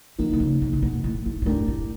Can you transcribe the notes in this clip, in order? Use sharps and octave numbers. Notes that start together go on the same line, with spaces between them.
D3 F3 A#3 D#4
C3
C#3
C3
C3
B2
A2
A2
A#2
A2 A3 D4 G4 A#4
A2